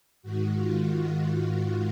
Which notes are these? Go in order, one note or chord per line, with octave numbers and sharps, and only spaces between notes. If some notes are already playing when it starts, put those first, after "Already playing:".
G#2 D#3 F#4
F4